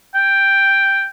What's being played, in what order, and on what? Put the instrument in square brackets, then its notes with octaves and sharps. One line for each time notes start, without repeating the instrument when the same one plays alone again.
[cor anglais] G5